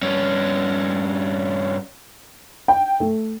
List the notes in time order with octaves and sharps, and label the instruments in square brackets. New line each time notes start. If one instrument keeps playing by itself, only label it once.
[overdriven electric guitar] G2 C#4
[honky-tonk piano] G5
A3